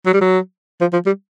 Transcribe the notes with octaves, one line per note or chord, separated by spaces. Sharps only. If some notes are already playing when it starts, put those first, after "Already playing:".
F#3
G3
F#3
F3
F3
G3